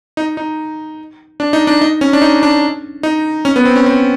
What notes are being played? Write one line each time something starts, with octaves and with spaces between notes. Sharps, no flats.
D#4
D#4
D4
D#4
D4
D#4
C#4
D4
D#4
D4
D#4
C#4
B3
C4
C#4
C4